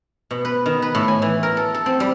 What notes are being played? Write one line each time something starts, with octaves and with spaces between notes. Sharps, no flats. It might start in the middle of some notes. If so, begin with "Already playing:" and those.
B2
B4
D#3
B4
A2
G#5
E3
A#4
A4
A4
C4
G3